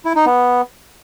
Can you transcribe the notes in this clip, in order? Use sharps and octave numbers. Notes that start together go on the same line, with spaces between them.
E4
D#4
B3